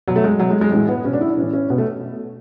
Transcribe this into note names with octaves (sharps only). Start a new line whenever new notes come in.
B2 F#3
A3
G#3
B2 F#3
G#3
G#3
A2 E3 G#3
B3
B2 C#4
D4
E4
D4
A2 E3 C#4
C#4
B2 B3
A3